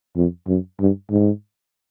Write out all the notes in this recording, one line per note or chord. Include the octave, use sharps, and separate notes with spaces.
F2
F#2
G2
G#2